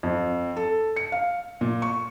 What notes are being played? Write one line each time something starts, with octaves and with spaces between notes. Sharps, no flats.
F2
A4
C#7
F5
A#2
C#6